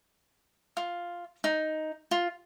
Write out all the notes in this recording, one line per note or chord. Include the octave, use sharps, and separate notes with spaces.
F4
D#4
F4